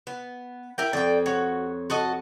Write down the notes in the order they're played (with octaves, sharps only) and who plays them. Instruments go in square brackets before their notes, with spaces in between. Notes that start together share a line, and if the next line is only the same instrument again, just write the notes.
[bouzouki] B3
E4 A#4 G5
[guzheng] F2 [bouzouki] D5 G5
[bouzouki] F#4 [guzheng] C#5
[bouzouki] F#4 A4 D#5